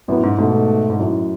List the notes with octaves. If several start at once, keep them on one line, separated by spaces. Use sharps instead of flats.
F#2 A2 B3
G#2
G#2 B2 A3
G#2
F#2 A2